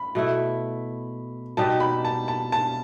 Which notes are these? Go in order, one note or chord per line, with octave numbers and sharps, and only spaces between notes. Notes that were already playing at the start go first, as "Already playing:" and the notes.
Already playing: B5
B2 A3 E4
B2 G3 D#4 G4 A5
B5
A5
A5
A5